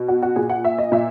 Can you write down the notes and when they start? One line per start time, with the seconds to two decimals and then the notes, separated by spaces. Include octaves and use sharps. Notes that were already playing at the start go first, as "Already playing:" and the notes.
Already playing: B2
0.08 F#4
0.22 F#4
0.36 A#2 G#4
0.50 F#5
0.65 E5
0.78 D#5
0.92 A#2 E5